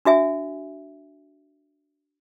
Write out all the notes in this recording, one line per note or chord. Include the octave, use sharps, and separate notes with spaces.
D4 F#4 E5 G#5